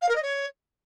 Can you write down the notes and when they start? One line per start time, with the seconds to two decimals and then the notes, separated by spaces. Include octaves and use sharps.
0.02 F5
0.09 A#4
0.15 D#5
0.22 C#5